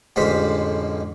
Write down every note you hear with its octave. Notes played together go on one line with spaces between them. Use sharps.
A1 F2 D3 G#3 C5 B5